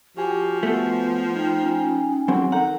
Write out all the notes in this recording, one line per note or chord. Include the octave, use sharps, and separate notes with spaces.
F3 F#4 G4 G#5
A3 B3
D#4 G5
C#4
C#2 F#3 C4
D#3 A4 F#5 A#5 G6